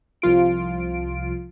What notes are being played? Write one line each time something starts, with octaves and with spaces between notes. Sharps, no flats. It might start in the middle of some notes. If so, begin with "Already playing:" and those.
C2 F3 F4 D7